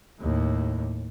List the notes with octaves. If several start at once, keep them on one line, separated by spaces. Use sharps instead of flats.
D#2 A2